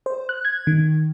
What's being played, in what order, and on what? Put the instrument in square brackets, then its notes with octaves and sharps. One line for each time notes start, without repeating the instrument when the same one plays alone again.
[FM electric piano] C5
F#6
G#6
D#3